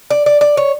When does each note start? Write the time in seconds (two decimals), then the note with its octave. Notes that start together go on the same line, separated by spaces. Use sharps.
0.10 D5
0.26 D5
0.41 D5
0.57 C#5